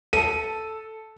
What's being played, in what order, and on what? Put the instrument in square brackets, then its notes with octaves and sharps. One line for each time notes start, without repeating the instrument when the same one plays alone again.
[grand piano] A4 A5 [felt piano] D#7